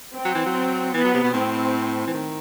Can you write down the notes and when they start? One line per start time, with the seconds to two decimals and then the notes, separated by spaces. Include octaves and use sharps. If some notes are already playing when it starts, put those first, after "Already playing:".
0.14 C4
0.25 F#3
0.35 E3
0.46 F#3
0.94 E3 B3
1.04 F#3
1.14 C3
1.24 B2
1.34 A2 C4
2.07 E3
2.14 D#3